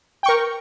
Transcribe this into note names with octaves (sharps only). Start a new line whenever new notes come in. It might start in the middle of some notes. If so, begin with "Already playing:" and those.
A#4 G5 C#6